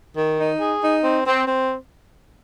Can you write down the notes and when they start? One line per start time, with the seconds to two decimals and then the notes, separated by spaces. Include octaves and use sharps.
0.17 D#3
0.39 D#4
0.60 G#4
0.83 D#4
1.04 C4
1.27 C4
1.48 C4